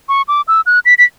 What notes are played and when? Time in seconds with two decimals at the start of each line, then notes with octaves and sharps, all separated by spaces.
0.09 C#6
0.28 D6
0.48 E6
0.66 F#6
0.85 B6
0.98 B6